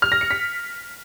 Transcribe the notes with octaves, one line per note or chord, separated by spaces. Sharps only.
F6
A#6
C#7
B6